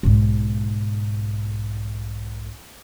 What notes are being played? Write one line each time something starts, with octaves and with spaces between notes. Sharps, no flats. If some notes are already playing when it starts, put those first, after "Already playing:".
B1 G#2